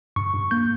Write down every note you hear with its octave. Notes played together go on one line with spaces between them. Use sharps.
G2 C#6
G2
A#3 G6